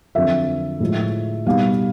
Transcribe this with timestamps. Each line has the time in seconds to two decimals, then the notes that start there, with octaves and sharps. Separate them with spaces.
0.15 F2 D3 F#3 E5
0.80 A2 F3 G#3
1.45 B2 G3 B3 D#4 F5